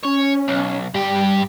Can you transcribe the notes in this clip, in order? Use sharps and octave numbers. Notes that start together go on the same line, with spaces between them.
C#4 C#5
B1
G2 G3 G4